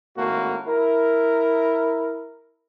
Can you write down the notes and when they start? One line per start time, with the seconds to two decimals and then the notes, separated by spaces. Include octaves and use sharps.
0.16 G#1 A2 A#3 F#4
0.67 E4 A#4